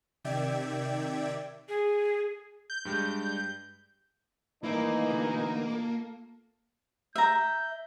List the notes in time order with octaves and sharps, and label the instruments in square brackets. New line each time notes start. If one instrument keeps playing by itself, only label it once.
[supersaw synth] C3 D#3 D5 E5 G5 G#6
[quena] G#4
[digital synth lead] G6
[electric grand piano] G2 G3 G#3
[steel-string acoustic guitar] G2 D#3 A3 [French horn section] E3 D#4 [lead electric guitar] A#3 [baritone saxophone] E4
[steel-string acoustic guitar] B2 D3 A3
F4 A4
[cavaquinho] E5 A#5 [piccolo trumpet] G6